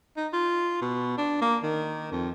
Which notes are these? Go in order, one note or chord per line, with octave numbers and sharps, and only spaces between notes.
D#4
F4
B2
D4
A#3
D#3
F2